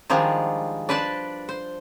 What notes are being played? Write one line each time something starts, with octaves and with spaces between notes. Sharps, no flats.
D#3 F3 G3 G#3 D4
D4 B4 C5 D5 A5
C5